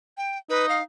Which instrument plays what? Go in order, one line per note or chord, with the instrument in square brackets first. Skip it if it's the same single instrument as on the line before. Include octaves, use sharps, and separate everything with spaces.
[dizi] G5
[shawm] D#4 [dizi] B4
[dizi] F5